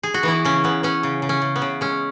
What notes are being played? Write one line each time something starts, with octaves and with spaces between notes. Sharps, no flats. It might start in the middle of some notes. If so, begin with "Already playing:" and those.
G#4
F#4
E3 B3 E4
C#3 C#4
C#3 B3
B3 C#4
C#3
C#3
C#4
C#3
B3
C#3
G#3 C#4